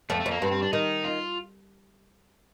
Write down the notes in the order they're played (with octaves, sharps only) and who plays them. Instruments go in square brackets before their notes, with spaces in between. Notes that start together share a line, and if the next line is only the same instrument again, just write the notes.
[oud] F2 [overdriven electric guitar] A3
[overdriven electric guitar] A3
[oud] F2
[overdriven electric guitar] A#3
[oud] G2 [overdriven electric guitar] C4
[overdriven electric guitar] C4
D4
[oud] D#3 [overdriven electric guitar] D#4
[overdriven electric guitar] F4